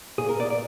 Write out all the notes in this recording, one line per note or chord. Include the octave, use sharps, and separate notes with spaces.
A#2 G#4
A#4
A#2 D5
D5